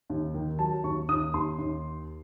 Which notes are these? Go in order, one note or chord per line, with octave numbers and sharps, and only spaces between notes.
D#2
D#3
F#3 A5
D#2 C#6
D#2 D#6
D#2 C6
D#2